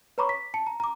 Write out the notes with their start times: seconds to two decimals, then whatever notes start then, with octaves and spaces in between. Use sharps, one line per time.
0.18 B4 C#5 A#5 B5 C#6 D6
0.29 B6
0.54 A5 C#7
0.67 A#5
0.80 A#5 D6